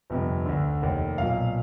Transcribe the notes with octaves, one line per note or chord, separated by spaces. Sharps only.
G1 F2 C3
D2 D3
F1 D#2 D#3
B1 A#2 F5